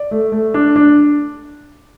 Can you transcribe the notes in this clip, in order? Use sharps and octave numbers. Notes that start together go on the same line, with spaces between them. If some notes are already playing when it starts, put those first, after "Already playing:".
Already playing: D5
A3
A3
D4
D4